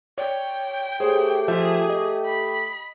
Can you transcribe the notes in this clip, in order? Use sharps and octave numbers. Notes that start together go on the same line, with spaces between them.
C#5 D5 G5
A3 G4 G#4 C5 C#5
F3 G#4 E5 G6
D#5
B5